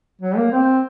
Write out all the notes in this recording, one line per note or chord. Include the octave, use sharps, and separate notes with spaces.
F#3
A#3
C4